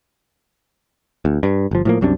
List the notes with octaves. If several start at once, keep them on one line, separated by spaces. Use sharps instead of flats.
D2
G2
G1 F3
A2 F3 A#3
C2 F#2 C3 D4